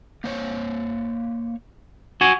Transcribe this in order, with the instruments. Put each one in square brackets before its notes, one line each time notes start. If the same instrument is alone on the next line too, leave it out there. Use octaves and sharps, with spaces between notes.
[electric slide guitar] A#3 C5 C#5
[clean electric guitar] F#4 G#5